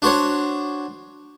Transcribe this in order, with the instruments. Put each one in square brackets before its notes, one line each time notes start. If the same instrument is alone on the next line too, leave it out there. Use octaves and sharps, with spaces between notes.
[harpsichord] D4 F#4 C5 C#5